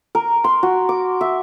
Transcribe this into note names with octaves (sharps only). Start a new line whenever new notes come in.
A#4
C6
F#4
D6
E5